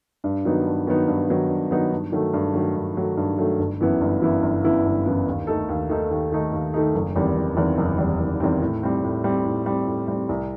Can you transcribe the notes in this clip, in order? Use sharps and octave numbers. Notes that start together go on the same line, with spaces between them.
G2
D#3 F#3 B3 D#4
G2
D#3 F#3 B3 D#4
G2
D#3 F#3 B3 D#4
G2
D#3 F#3 B3 D#4
G2
D#3 F#3 A3
G2
D#3 F#3 A3
G2
D#3 F#3 A3
G2
D#3 F#3 A3
G1
F#2 E3 B3 E4
G1
F#2 E3 B3 E4
G1
F#2 E3 B3 E4
G1
F#2 E3 B3 E4
D#2
D#3 A3 D#4 A4
D#2
D#3 A3 D#4 A4
D#2
D#3 A3 D#4 A4
D#2
D#3 A3 D#4 A4
F#1
E2 D#3 G3 C4
F#1
E2 D#3 G3 C4
F#1
E2 D#3 G3 C4
F#1
E2 D#3 G3 C4
A2
G3 C4
A2
G3 C4
A2
G3 C4
A2
G3 C4
C2